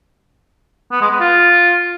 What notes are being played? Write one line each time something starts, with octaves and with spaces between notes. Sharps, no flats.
B3
G#3
B3
F4